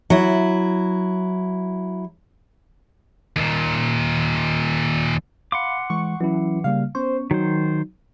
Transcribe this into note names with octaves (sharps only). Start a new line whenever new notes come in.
F#3 E4
D#2 A#2
F5 F#5 B5 C6 D6
E3 G#3 C#6
E3 F#3 C#4 E4
C#3 G3 A#3 F5
B3 C#4 C5 C#6
D#3 F#3 D#4 C5